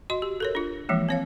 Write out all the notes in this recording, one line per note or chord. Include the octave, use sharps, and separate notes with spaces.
F#4 D#5 C6
G4
A4 A#4 C#5
D4 F4
E3 F3 G#3 A#3
C4 C#5 F5